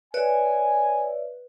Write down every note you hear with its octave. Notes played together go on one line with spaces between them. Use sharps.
B4 C#5 D5 E5 G#5